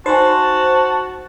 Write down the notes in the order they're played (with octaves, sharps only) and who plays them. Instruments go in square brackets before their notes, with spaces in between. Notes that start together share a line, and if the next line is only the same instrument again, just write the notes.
[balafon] D#4 G#5 [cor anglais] F#4 [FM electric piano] C5 [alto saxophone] A5